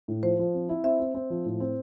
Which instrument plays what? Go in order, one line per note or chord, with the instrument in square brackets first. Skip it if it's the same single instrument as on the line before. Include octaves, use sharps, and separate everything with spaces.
[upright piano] A2
[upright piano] F3 [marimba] C5
[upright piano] F3
C4
E4
[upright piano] C4 [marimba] E5
[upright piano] C4
C4
F3
A2
C4